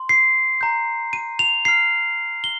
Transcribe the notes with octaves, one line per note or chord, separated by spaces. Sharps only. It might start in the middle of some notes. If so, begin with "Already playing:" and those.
Already playing: C6
C7
A#5 G6
D#7
F7
A#5 F6 C7
G7